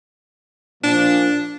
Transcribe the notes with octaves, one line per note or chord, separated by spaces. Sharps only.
A#2 F3 D4